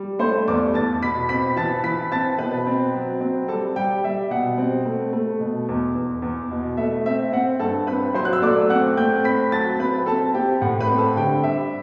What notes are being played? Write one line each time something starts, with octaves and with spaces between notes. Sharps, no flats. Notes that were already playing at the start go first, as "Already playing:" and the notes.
Already playing: G3
A3 C5 C6
E2 D5 D6
E2 A5 A6
B2 B5 B6
C4 B5 B6
E3 A5 A6
E3 B5 B6
C4 A5 A6
B2 B4 B5
C4
F#3
C4
G3 A4 A5
G3 G4 G5
G3 E5
B2 F#5
C4
A3
A3
B2
E2
E2
E2
B2
A3 E5
C4 E5
C4 F#5
G2 A4 A5
C4 B4 B5
F#3 C5 C6
F#6
E6
A3 D5 D6
C4 F#5 F#6
A3 G5 G6
C4 B5 B6
F#3 A5 A6
C4 B4 B5
C4 A4 A5
C4 G4 G5
A2 F#5
B4 B5
C4
A4 A5
D3 G4 G5
G3 E5